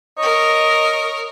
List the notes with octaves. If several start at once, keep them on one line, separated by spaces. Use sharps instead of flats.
A#4 C#5 D#5